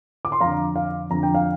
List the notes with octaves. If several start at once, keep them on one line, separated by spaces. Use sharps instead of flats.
D6
C6
F2 D3 F5 A#5
F5
F2 D3 A#5
G5
F5